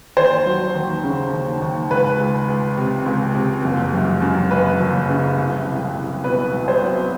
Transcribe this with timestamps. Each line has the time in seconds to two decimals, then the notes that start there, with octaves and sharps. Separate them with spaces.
0.17 D#2 C5
0.46 F#3
0.75 D#2
1.04 C#3
1.33 D#2
1.62 D#2
1.91 C#2 B4
2.19 C#2
2.48 C#2
2.77 C3
3.06 C#2
3.35 C3
3.64 F#1
3.93 F#2
4.22 F#2
4.51 F#1 B4
4.80 F#1
5.09 C#3
5.38 C2
5.67 C2
5.95 C2
6.24 B2 B4
6.53 C2
6.68 C5
6.82 F#3